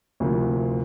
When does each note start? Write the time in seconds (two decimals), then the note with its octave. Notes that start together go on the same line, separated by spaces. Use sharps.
0.20 D2 C3 F3 A#3 E4